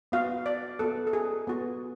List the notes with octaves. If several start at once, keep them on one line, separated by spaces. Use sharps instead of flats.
B3 F#4 F5
D5
B3 F#4 A4
A4
G#4
B3 F#4